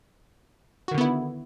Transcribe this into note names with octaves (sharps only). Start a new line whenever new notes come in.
D3 D#3 B3 E4 F#4